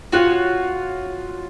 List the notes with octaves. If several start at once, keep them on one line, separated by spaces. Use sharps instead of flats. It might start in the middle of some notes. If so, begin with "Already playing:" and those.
F4 F#4 C#5 F#5